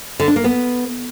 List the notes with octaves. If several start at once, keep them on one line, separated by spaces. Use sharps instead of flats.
D3
D4
A#3
B3